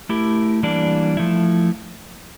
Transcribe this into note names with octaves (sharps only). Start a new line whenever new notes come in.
A3 E4 G4 A#4
E3 G3 A#3 D4
F3 A3 E4